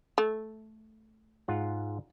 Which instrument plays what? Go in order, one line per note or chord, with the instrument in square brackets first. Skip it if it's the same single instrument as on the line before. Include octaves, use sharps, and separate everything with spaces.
[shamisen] A3
[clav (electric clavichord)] G#2 F4 F#5